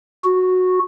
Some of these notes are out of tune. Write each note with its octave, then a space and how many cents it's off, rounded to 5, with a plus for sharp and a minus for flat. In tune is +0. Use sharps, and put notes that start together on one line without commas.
F#4 -10